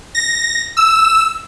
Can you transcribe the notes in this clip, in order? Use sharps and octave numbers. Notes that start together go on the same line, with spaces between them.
A#6
E6